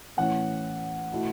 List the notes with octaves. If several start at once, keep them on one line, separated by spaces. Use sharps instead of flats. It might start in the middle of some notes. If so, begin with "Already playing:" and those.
A2 E3 C#4 F#5
B2 A3 E4